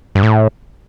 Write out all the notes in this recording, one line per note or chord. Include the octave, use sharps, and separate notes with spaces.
G2
A2